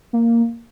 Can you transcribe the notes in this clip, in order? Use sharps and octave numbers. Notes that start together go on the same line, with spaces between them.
A#3